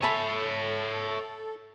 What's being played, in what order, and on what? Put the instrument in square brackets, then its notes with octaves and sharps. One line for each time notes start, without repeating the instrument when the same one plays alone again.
[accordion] A4 [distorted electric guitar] C#5 E5 [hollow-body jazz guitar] G#5 A5 B5